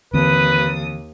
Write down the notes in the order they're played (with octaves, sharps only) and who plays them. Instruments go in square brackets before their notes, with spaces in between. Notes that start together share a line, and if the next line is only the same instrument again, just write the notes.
[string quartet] D#2 D#6 [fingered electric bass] D3 E3 C4 [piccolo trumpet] B4